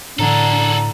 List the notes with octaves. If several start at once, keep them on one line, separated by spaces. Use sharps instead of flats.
A2 D3 D4 G#4 A4 A#5